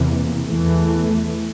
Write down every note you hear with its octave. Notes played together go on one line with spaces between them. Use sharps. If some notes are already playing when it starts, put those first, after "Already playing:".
Already playing: E2 C3 E3 A#3
E2 E3 A3